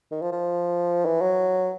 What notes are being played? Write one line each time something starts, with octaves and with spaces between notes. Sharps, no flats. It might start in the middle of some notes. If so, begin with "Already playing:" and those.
D#3
F3
F3
E3
F#3